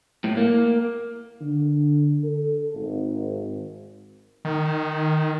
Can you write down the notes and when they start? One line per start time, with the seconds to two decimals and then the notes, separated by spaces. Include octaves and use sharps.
0.24 A2
0.37 A#3
1.40 D3
2.24 A4
2.74 G#1
4.45 D#3